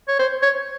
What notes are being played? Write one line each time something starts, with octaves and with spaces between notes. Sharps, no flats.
C#5
C5
C#5